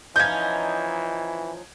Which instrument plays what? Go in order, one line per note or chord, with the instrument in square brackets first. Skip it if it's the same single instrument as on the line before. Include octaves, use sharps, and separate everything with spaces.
[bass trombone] E3 [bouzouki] F3 C#4 D#4 [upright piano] G6 G#6